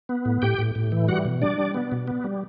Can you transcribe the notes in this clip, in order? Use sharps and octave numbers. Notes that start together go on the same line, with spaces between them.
B3
A2
A2 G4 G5
A2
A2
E3
G3 F#4 F#5
B2
G3 D4 D5
G3
B3
B2
B3
G3